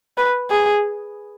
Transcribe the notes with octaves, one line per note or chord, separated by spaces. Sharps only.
B4
G#4